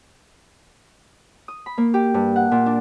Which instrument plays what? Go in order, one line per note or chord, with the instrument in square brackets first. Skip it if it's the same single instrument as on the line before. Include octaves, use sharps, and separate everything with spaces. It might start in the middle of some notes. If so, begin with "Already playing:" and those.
[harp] D#6
B5
A#3
G4
G2
F#5
A#2
D4